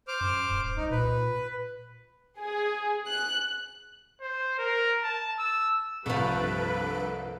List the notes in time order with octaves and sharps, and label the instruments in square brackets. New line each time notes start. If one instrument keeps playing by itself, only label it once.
[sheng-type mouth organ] C5 D6 F6
[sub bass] F#2
D1
[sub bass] C2 [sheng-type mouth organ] D#4
[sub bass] A#2 [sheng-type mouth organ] B4
[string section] G#4
F#6
[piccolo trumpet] C5
A#4
A5
E6
[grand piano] C2 [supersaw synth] G2 A4 D7 [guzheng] F3 A3 [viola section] B4